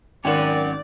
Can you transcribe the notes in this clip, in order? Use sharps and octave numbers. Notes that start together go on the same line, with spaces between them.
G#1 C#4 A#4 D5 F#5 G5